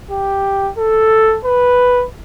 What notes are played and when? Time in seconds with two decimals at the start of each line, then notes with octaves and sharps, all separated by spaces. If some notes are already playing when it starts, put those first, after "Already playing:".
0.11 G4
0.78 A4
1.45 B4